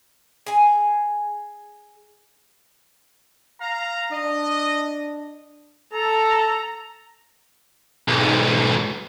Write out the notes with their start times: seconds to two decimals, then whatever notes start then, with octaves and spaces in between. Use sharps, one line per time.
0.46 G#4 G#5
3.60 F5 A#5
4.12 D4 D#5
5.93 A4 A#5
8.08 B1 G#2